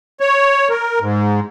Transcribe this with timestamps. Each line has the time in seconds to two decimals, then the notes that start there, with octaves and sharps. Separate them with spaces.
0.20 C#5
0.70 A#4
1.00 G#2